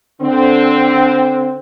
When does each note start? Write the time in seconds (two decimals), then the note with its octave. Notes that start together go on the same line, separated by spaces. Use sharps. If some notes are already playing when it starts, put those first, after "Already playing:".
0.20 D3 C4